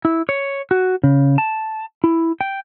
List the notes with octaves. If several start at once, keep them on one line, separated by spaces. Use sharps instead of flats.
E4
C#5
F#4
C#3
A5
E4
G5